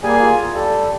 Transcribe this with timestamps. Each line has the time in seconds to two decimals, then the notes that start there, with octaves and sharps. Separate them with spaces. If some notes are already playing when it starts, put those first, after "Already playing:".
0.03 G3 A#3 G#4 G#5
0.19 F4
0.40 E2
0.55 G3 A4